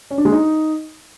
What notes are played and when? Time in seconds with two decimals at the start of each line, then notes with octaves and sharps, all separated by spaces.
0.11 C#4
0.18 D4
0.25 G#3
0.32 D#4